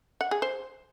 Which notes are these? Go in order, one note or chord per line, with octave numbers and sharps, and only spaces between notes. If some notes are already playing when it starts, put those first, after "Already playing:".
F#5
G#4
C5